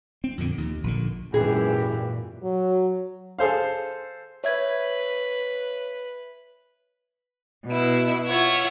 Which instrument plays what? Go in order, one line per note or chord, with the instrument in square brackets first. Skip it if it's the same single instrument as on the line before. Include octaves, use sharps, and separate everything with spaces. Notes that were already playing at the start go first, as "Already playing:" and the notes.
[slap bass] C4
F2 A#2 D3
D#2
A#1 A#2 D3
[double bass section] G#1 F#2 E3 [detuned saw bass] A#2 [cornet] G4 [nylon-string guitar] G#4
[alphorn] F#3
[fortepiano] G#4 A4 C5 F5
[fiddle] B4 [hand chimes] C#5 E5 G#6
[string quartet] B2 E4
F4 C#5 E5 F#5